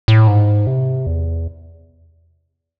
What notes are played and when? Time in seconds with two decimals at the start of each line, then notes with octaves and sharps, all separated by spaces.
0.08 A2
0.27 G#2
0.67 C3
1.06 E2